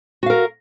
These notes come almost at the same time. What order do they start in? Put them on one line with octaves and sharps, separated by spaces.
F#4 F5 A#4